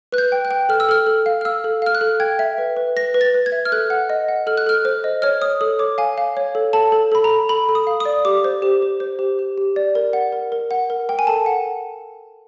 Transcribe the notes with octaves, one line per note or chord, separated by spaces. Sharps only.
B4 F#6
G6
G5
F#6
G5
A4 F6
E6
A4 F6
A4
F5
F6
F5 E6
A4
F5 F6
F#6
A4
G5 G#6
E5
B4
B4
B4 A#6
B4
A6
B4
G#6
E5
F6
A4 F#6
F#5
D#5
F#5
A4 F6
F#6
A4 F6
C5
D#5
C#5 F6
C#5 D#6
A4 D#6
C#5 D6
F5 G#5
F5
C#5
A4
A4 A5
A4
A4 B5
A#5
A4
A4 B5
A4
D#6
F5
D#6
D5
G4 D6
C5
G4
C5
C5
G4
G4
G4
D5
A#4
F#5
A#4
A#4
F#5
A#4
A#4 G5
G#5
A4 A5
F#5